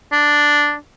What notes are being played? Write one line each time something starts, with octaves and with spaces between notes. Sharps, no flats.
D4